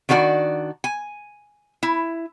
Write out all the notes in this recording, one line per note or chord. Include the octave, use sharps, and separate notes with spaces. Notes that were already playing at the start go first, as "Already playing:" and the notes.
D#3 D4 F#4 A4 D5
G#5
E4